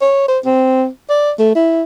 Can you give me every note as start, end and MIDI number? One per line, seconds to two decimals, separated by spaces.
0.01 0.27 73
0.28 0.39 72
0.45 0.87 60
1.10 1.32 74
1.39 1.54 57
1.55 1.83 64